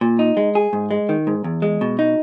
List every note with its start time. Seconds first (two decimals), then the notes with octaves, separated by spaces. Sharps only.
0.01 A#2
0.19 D#4
0.37 G#3
0.55 G#4
0.73 G#2
0.91 G#3
1.09 D#3
1.27 G#2
1.44 E2
1.62 G#3
1.81 B2
1.99 D#4